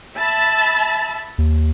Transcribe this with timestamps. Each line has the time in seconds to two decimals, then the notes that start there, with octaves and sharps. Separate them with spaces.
0.18 E5 A5 B5
1.38 D#2